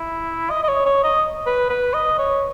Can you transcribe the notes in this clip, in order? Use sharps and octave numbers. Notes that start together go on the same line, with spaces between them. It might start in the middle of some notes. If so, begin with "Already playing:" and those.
Already playing: E4
D#5
D#5
C#5
C#5
D#5
B4
B4
D#5
C#5